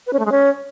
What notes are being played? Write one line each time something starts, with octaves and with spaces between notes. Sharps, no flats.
B4
C#4
A3
G#3
C#4